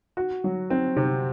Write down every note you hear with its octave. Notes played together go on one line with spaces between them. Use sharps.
F#4
F#3
C4
C3